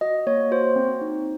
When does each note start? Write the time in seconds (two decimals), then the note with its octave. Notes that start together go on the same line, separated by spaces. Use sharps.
0.01 F#4 D#5
0.27 A#3 C#5
0.51 F#4 C5
0.76 C4
1.01 D#4